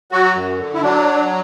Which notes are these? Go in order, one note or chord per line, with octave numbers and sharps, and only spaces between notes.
F#3 F#4
F#2
D3
E4
F#3 D4